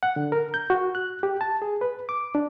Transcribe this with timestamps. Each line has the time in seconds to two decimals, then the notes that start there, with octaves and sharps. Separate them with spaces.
0.03 F#5
0.16 D3
0.32 A#4
0.54 G6
0.70 F#4
0.95 F#6
1.23 G4
1.41 A5
1.62 G#4
1.81 B4
2.09 D6
2.35 D4